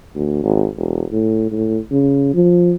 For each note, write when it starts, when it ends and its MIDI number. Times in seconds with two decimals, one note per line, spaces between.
0.15 0.41 38
0.43 0.67 32
0.77 1.05 28
1.12 1.51 45
1.51 1.79 45
1.91 2.31 49
2.34 2.74 53